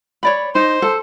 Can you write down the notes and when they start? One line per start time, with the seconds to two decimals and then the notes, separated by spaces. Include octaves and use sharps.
0.23 C#5 D5 B5
0.55 D#4 C5
0.82 A4